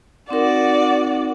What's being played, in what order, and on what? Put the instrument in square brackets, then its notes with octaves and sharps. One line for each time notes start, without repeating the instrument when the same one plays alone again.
[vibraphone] C4 D#4 A#4 [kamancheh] F#4 D5